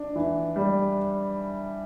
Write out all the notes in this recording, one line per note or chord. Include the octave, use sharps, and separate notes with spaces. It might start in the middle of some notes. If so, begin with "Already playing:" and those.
Already playing: D4
E3
G3